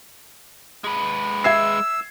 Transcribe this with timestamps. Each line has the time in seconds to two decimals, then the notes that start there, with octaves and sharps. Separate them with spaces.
0.84 G#3 B4
1.44 E5 E6 G#6 C7